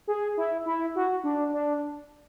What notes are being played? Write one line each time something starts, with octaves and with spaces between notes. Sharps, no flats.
G#4
E4
E4
F#4
D4
D4